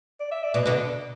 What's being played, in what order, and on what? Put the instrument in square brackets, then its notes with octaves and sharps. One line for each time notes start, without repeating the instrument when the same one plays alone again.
[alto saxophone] D5
E5
D5
[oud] B2 [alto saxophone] D5
[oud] B2 D3